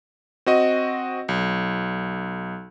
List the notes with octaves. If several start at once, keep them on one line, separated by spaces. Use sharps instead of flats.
C4 F#4 D#5
B1